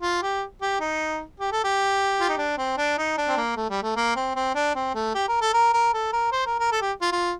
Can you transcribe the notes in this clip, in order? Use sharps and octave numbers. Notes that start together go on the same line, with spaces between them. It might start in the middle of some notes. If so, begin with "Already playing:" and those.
F4
G4
G4
D#4
G4
A4
G4
F4
D#4
D4
C4
D4
D#4
D4
C4
A#3
A3
G3
A3
A#3
C4
C4
D4
C4
A3
G4
A#4
A4
A#4
A#4
A4
A#4
C5
A#4
A#4
A4
G4
F4
F4